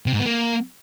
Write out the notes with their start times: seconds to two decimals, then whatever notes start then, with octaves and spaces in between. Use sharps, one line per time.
0.06 C3
0.13 G#2
0.20 B3
0.26 A#3